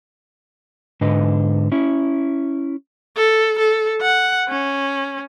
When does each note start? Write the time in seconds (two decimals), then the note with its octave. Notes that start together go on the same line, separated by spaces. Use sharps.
1.01 G#2 D3 B4 D#5
1.72 C#4 E4
3.17 A4
3.59 A4
4.02 F#5
4.49 C#4